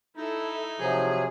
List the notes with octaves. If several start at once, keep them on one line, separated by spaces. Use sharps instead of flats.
D#4 E4 A4
C3 F3 F#3 G#4